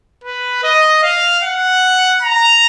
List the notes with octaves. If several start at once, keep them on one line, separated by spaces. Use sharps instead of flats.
B4
D#5
F5
F#5
A#5